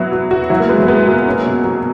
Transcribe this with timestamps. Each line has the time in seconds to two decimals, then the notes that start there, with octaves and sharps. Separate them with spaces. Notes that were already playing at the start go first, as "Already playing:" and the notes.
Already playing: F#3 B3 E4 F#4
0.12 F#4
0.31 F#4
0.50 F#3 E4
0.60 A#3
0.69 G#3 B3
0.78 F#3
0.88 G#3 B3
1.07 F#3 A#3
1.26 C#4
1.46 B2
1.64 F#3